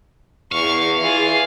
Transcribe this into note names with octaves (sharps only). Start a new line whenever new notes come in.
E2 F5 C#6
E3 F4 G#4